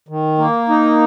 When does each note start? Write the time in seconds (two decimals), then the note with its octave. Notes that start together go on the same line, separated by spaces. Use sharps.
0.08 D#3
0.38 A#3
0.69 D#4